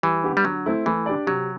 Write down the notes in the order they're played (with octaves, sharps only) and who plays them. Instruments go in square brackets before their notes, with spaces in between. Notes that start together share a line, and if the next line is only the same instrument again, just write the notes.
[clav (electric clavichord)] E3 [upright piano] G3
[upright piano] B3 D4 G4
[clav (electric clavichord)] G3
[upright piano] D3 [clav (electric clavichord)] F#3
[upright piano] A3 C4 E4 A4
[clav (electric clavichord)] E3 [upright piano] A3
[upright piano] D4 G4 D5
[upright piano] C3 [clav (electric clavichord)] F#3